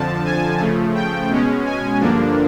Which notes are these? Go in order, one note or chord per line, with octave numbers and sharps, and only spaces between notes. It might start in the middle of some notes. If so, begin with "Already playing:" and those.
Already playing: F2 D3 F3 A5
G#5
C#3 F3 A3
G5
B2 G#3 C#4
G#5
G2 D3 F3 A#3 D4